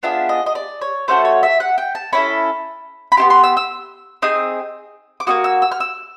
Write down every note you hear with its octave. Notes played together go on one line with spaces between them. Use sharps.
B3 D4 F4 G#4 E5
D#5
D#5
D5
C#5
A3 C#4 F#4 A4 C5
C#5
E5
F#5
G5
A5
C#4 E4 A4 B5
B5
B3 E4 G4 C6
C6
E6
E6
C4 D#4 G#4 D#6
D6
A#3 C#4 F#4 D#6
E6
E6
F6
E6